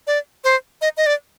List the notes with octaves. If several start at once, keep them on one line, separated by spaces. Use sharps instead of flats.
D5
C5
D#5
D#5
D5